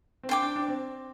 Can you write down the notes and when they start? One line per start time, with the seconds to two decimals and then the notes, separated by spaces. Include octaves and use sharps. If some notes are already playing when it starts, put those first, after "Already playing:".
0.23 C4
0.29 D4 C5 G5 D6
0.42 D4
0.56 D4
0.68 C4